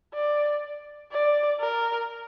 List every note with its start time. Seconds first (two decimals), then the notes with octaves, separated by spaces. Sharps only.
0.14 D5
1.12 D5
1.61 A#4